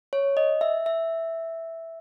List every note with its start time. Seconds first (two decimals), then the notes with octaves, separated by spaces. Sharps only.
0.13 C#5
0.37 D#5
0.61 E5
0.86 E5